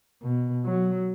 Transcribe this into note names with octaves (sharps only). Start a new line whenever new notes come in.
B2
F#3